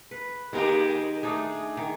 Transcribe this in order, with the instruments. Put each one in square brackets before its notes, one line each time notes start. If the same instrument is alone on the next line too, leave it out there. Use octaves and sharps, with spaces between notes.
[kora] B4
[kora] D#3 A#4 F5 [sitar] G#3 A#3 G4
[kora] A3 D4 D#4 [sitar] G#4
[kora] D#3